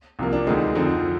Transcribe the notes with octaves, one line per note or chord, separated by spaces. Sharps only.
C2 C3 F3 A#3
D4
D2 D3 G#3 C4 D#4
F2 D3 F3 C4 D#4